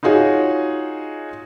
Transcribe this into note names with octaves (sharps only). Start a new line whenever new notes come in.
D#4 F4 F#4 G#4 C#5